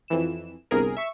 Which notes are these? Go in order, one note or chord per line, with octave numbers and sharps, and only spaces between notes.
F2 E3 E7
G1 C2 G#4 A#4
E5 C#6